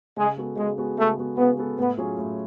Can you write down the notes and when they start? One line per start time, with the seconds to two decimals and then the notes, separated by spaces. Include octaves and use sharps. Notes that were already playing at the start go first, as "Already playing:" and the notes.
0.17 C#3 G#3
0.37 G#3 B3 F#4 A4
0.57 C#3 G#3
0.78 G#3 B3 F#4 A4
0.98 C#3 A3
1.18 G#3 B3 F#4 A4
1.37 C#3 B3
1.57 G#3 B3 F#4 A4
1.78 A2 B3
1.97 F#3 C#4 F4 G#4
2.18 A2